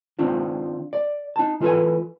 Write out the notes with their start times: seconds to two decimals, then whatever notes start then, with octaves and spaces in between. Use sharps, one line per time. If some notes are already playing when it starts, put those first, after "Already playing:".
0.19 D#3 C4 D4 F4
0.93 D5
1.36 D#4 A5
1.60 E3 F4 A4 B4 G#5